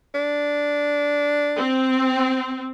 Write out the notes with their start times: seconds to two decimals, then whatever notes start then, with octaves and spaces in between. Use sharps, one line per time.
0.14 D4
1.56 C4